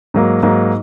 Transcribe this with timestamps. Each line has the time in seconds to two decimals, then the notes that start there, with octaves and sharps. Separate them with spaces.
0.14 G#2 F#3 A#3
0.43 G#2 F#3 A#3